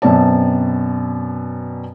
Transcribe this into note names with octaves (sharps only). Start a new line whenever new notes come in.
F#2 B2 C4 D5 A5